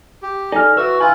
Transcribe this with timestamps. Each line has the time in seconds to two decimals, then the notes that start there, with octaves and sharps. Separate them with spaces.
0.22 G4
0.52 D#4 A4 D5 G#5 F6
0.77 E3 F#4 B4 E5 E6
1.00 D3 E4 F4 B4 G#5